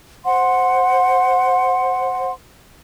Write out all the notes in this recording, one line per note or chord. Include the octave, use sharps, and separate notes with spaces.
C5 F#5 C6